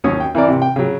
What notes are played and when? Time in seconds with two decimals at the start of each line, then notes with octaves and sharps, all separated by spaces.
0.04 D#2 F#3 C#4 C#5 D#6
0.20 G5
0.35 E3 E4 A#4 D5
0.48 C3
0.62 G5
0.76 C#3 F#3